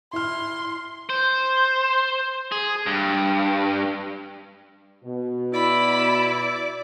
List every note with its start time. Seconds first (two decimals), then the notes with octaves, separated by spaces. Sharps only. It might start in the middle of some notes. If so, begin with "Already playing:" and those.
0.13 E4 C6 F6
1.10 C5
2.52 G#4
2.86 G2
5.04 B2
5.54 E4 D5 B5